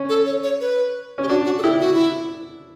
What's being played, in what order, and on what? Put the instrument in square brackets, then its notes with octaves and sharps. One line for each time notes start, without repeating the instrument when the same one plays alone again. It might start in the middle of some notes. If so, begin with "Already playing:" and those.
Already playing: [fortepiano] C#4
[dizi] A4
C#5
C#5
B4
[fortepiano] C#4 [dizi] G4
[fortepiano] D4 [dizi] F#4
[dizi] F#4
A4
[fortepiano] E4 [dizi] G4
[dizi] F#4
E4